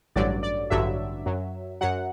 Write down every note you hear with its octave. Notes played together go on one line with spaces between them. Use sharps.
A1 G2 D3 F#3 D5
D5
A1 G2 D3 F#3 E5
F#2 F#3
F#2 F#3 F#5